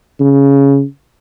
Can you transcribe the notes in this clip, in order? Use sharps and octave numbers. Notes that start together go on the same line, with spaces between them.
C#3